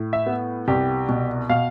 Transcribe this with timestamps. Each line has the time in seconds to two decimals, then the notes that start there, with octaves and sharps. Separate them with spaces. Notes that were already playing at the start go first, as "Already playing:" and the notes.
Already playing: A2
0.13 E5
0.26 B3
0.68 C2 G4
1.09 B2
1.49 B2 F5